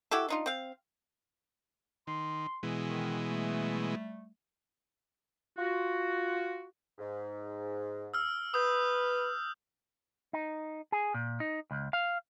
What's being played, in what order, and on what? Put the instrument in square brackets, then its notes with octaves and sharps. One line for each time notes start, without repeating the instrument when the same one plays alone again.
[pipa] E4 F#4 G4 A4
D4 D#4 F4
C4 F5
[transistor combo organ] D#3 [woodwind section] C6
[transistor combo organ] B2 E3 G#3
[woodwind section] D#3
G3 A3
F4 F#4
G#2
[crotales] E6 F6
[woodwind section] B4 [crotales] D#6 G6
[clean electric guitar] D#4
G#4
A#2
D#4
C#2
F5